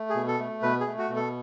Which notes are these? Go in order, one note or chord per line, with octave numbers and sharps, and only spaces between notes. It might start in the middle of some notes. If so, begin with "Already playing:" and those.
Already playing: A3
G#4
B2
A4
A3
B2 B4
G#4
A3
F#4
B2
A4